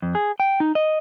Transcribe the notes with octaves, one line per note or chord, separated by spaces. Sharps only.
F2
G#4
G5
D#4
D#5